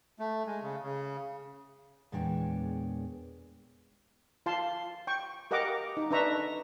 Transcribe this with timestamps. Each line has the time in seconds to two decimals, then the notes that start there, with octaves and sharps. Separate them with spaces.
0.19 A3
0.46 G#3
0.63 C#3
0.83 C#3
2.12 E2 A#2 G#3 D4 C#5 G5
4.46 F4 F5 A5 C6
5.07 G5 C#6
5.51 G4 A#4 D#5 F#5 A#5 D6
5.97 D#4
6.11 D4 D#4 B4 E5 A#5 C#6